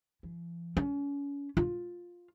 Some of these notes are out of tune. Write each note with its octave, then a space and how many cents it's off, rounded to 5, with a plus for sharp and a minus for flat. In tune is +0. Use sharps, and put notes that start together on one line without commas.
F3 -45
C#4 +35
F4 +10